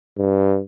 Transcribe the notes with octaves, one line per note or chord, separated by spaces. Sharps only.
G2